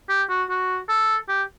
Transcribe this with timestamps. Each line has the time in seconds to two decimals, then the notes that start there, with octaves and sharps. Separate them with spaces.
0.09 G4
0.29 F#4
0.50 F#4
0.89 A4
1.28 G4